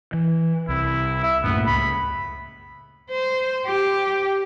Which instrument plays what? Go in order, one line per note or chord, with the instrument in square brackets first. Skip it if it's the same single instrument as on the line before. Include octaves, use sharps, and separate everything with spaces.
[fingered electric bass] E3
[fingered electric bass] C2 [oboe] E4
[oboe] E5
[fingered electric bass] F#2 A2 A#3 [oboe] B3
[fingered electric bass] C#2 [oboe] B5
[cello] C5
G4